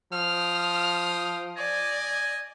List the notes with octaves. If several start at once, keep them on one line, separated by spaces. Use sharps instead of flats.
F3 F5 G5 D#6 F6
D5 D#5 G#5